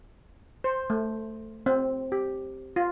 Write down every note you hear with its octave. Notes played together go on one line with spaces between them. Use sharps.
C5
A3
C4
G4
F4